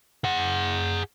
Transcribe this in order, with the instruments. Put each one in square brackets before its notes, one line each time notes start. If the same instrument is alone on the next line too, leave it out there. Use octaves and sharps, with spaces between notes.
[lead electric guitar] G#4 F#5